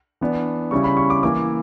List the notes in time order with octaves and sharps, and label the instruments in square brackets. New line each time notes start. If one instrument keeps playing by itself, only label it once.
[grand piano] E3 B3 D4
C#3 G3 C#4 E4 C#6
B5
C#6
D6
E3 A#3 E4 D6